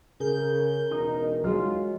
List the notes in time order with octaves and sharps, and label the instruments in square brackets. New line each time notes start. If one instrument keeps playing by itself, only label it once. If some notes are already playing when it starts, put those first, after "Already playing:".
[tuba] C#3 [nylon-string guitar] G#4 [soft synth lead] A#4 [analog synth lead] G6
[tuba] E1 [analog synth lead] D#4
[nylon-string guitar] F#3 G#3 D#4 [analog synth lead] F4